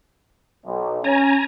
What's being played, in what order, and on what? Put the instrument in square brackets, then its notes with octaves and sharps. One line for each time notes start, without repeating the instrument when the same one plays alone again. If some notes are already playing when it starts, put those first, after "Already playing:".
[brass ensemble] B1
[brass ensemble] C#4 [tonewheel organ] G#5 A#5